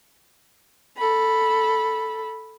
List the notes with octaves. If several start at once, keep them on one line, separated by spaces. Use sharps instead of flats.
A4 B5